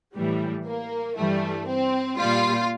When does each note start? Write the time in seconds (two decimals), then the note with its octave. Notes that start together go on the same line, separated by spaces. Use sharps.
0.14 A2 E3 G3
0.65 A#3
1.16 G2 E3 G3 A3
1.67 C4
2.18 A#2 G3 F4